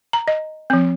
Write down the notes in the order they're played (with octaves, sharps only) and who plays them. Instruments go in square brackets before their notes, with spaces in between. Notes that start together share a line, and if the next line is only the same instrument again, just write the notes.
[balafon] A#5
D#5
F3 C4